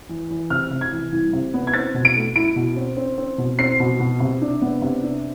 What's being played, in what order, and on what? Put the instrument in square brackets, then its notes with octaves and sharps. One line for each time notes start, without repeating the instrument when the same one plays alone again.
[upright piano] E3
E3
C3 F6
C3
G#6
E3
C2
C3
B3
G#6
C4 A6
B2
D7
A3
E4 D7
B2
C4
C4
C4
B2
C4 C7
B2
B2
C3
D4
B3
C3
D4